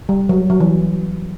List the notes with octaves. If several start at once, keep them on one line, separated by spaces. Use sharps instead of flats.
G3
F#3
F#3
E3